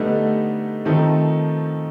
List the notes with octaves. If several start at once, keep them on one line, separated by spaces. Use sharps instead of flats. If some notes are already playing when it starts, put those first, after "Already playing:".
Already playing: D3 G3 A3 B3 D#4
D#3 F3 A3 C4 D#4